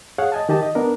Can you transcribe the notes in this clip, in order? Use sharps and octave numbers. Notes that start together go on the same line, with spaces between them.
G#4 C#5 F5 F#5
D#5 G#5 A5
D#3 G4 D#5 A5
D#5
B3 D4 A#4